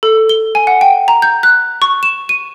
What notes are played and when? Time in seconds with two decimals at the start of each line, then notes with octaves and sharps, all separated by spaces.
0.03 A4
0.29 G7
0.55 G#5
0.67 F#5
0.81 G5
1.08 A#5
1.22 G6
1.43 F#6
1.82 C#6
2.03 E7
2.29 D#7